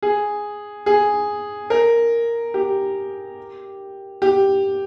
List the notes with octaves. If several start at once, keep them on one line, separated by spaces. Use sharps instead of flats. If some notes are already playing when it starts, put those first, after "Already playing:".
G#4
G#4
A#4
G4
G4